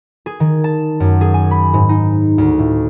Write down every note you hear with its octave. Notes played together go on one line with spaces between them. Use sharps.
G#4
D#3
A5
F#2
G#4
G#5
B5
G#2
D#4
D2
A2